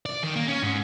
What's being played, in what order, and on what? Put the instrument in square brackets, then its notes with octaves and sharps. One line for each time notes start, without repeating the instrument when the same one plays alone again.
[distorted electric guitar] D5
D#3
A#3
C#4
G#2